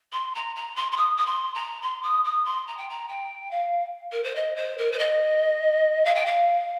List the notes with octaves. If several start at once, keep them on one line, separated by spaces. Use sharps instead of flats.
C6
A#5
A#5
C6
C6
D#6
D#6
C6
A#5
C6
D#6
D#6
C6
A#5
G5
A#5
G5
F5
A#4
C5
D#5
C5
A#4
C5
D#5
F5
G5
F5